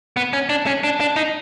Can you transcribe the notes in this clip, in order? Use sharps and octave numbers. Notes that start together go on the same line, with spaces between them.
B3
C#4
D4
C#4
D4
D4
D#4